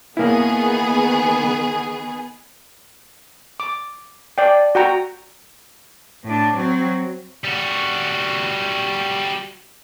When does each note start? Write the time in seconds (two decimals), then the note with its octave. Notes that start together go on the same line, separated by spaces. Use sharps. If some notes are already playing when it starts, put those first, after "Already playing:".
0.17 D#3 A#3 B3 E4 G#4
3.60 D6
4.38 D5 G5
4.75 F#4 G5 A#5
6.24 A2 D4
6.55 F#3 C4
7.45 G3 F#4